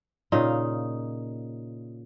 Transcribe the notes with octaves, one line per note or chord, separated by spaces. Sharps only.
A#2 C#3 D#4 F5